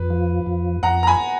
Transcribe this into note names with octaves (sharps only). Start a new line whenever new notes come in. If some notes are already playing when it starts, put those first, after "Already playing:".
Already playing: F2 B4
F3
F2
F2 F#5 A#5
A#5
G#5 B5